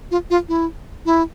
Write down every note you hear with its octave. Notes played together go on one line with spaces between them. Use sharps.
F4
F4
E4
E4